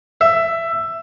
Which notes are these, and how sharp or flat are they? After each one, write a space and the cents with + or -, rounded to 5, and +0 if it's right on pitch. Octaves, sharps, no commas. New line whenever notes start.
E5 +15